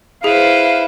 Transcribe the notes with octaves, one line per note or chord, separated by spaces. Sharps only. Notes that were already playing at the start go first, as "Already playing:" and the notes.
E4 G#4 B4 C5 F5